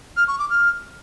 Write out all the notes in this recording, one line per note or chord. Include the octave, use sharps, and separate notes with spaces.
F6
C#6
D6
F6